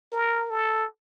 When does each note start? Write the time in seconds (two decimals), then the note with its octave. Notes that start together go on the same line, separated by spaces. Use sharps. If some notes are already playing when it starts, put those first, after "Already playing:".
0.12 A#4
0.50 A4